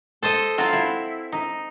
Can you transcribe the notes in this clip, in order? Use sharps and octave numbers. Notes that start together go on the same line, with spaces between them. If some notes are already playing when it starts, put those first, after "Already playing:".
A4 C5 D#5
F#3 C4 F4
E4
D#4